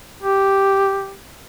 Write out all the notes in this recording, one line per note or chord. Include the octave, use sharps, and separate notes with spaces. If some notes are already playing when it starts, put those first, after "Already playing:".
G4